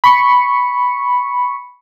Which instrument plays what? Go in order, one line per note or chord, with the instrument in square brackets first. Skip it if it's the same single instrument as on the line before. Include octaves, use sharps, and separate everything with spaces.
[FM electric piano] B5 C#6 C#7